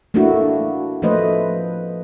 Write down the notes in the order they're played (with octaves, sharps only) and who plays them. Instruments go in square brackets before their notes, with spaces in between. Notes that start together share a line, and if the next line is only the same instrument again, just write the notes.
[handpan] A3 A#3 D4 E4 F#4
F3 A3 A#3 B4 C5 D#5